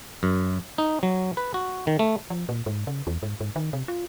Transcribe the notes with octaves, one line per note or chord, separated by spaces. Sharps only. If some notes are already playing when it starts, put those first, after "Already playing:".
F#2
D#4
F#3
B4
F#4
D#3
A3
F3
A#2
G#2
C#3
E2
G#2
G#2
D#3
C3
F4